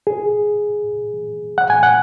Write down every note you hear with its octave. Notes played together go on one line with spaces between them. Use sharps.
G#4
F#5
G#5
F#5